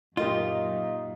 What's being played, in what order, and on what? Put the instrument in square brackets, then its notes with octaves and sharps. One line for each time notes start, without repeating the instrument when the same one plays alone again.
[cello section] F#2 A#2 [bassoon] D#4 [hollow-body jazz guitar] F4 [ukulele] G4 A#4 D#5